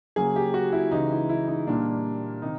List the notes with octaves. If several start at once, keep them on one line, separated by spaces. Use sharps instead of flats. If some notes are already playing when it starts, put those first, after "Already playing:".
C#3 F#3 A#3 G#4
G4
F#4
E4
C#3 E3 G#3 D#4
E4
E4
D#4
A#2 G3 A#3 D4
C3 D#3 D#4